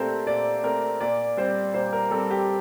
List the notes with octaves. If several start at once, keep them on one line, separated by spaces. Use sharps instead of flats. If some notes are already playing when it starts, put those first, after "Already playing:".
Already playing: A#2 A3 C4 G4 A4 A#4 C5 D5
A#2 D5
A3 C4 A#4
A#2 D5
G3 C4 C5
A#2 C5
A#4
G3 C4 A4
G4